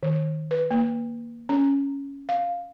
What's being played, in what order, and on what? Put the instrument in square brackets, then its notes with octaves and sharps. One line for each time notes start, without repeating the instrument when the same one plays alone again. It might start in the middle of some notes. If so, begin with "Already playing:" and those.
[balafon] D#3
B4
A#3
C#4
F5